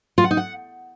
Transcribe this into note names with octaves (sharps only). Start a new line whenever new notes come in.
F4
F#5
D#4
F#5